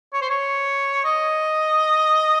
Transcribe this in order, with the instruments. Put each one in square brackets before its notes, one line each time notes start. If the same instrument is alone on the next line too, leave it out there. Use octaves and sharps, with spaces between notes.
[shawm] C#5
C5
C#5
D#5